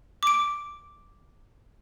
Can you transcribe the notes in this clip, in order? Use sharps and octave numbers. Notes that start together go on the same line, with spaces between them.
D6 D7